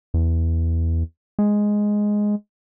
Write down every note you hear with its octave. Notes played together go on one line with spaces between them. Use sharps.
E2
G#3